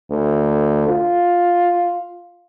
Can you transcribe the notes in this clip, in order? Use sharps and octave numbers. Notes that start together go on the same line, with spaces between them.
D2
F4